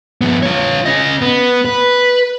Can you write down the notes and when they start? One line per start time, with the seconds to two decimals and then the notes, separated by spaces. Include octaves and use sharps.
0.21 F3 B3
0.43 F4 C#5
0.86 C#4 D#5
1.21 B3
1.65 B4